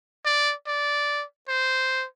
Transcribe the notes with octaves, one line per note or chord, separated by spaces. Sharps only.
D5
D5
C5